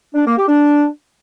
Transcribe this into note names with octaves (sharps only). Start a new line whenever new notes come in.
D4
A#3
G4
D4